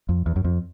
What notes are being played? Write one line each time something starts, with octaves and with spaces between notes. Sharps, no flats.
F2
E2
F#2
F2